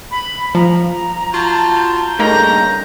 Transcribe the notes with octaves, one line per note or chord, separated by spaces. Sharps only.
B5
F3 A#5
F4 F#4 A5 G6
G2 C#3 A3 A#3 D#4 A#5